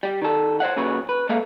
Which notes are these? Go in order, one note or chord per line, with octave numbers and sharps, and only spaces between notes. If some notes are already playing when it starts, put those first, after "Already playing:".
G3 G4
D#3 A4
C5 C#5 E5 F#5
A#2 C#3 F#3 B4 C#5
B4
G#3 A#3 A4 B4 E5 F5